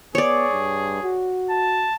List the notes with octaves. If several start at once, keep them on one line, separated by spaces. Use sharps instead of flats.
B3 G#4 C#5 D5
G2
F#4
A5